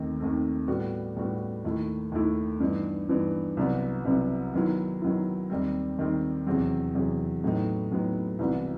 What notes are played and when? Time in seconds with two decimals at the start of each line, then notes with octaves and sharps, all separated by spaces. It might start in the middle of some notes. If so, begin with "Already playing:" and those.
Already playing: D#2 D#3 A3 C4
0.20 D#2 D#3 A3 C4
0.67 A2 G3 B3 F#4
1.16 A2 G3 B3 F#4
1.65 D#2 D#3 A3 E4
2.12 D#2 D#3 A3 E4
2.60 G2 E3 B3 D#4
3.09 G2 E3 B3 D#4
3.57 C2 C3 F#3 B3
4.05 C2 C3 F#3 B3
4.54 D#3 F#3 B3 E4
5.02 D#3 F#3 B3 E4
5.50 D#2 D#3 G3 C4
5.98 D#2 D#3 G3 C4
6.46 E2 C3 F#3 C4
6.95 E2 C3 F#3 C4
7.44 A2 F#3 B3 D#4
7.91 A2 F#3 B3 D#4
8.39 C2 C3 E3 B3 F#4